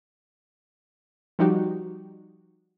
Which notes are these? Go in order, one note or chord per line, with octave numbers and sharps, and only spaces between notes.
F3 G3 D#4 F#4 G4